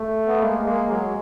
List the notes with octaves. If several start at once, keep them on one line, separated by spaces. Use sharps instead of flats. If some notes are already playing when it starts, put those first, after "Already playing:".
Already playing: A3
B3
G#3 A#3
G#3 A#3
F#3 G#3